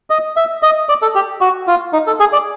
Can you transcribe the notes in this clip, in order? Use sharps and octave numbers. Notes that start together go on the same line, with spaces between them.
D#5
E5
D#5
D5
A4
G4
F#4
F4
D#4
A4
G#4
D5